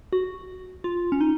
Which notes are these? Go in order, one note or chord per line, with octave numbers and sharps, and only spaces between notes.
F#4
F4
C#4
D#4